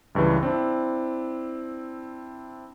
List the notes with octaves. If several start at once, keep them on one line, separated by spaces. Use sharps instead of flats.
C#2 G2 C#3 E3
C4 D4 E4